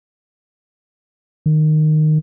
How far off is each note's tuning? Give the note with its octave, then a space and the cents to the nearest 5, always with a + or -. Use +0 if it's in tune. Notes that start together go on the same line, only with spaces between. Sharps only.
D#3 -15